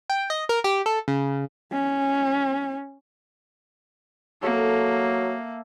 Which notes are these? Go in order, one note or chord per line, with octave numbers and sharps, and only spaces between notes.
G5
D#5
A#4
G4
A4
C#3
C#4
F#3 A#3 A4 E5